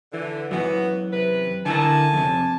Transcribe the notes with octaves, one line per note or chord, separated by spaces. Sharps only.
D3 E3
F#2 E3 B3 F#4
C3 B4
D3 E4 A#4 G#5 A5
F2 C3